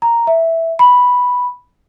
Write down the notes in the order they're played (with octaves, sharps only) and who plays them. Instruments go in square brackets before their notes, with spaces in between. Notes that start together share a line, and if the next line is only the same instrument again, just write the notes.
[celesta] A#5
E5
B5